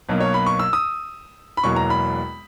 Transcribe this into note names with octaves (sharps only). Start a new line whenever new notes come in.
B1 B2 F#3 A#3
C#5
B5
C#6
E6
D#6
B5
E1 E2 B2 F#3 A#3 C#6
A#5
B5